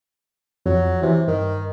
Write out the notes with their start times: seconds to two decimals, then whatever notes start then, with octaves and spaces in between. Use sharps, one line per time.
0.66 F2 F#3
1.02 C3 E3
1.28 G2 D#3